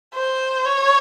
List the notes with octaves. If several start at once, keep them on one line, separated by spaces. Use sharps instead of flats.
C5
C#5